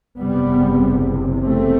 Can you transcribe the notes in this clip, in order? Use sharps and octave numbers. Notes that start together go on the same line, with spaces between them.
F#1 E2 C3 G3 B3
A3 C4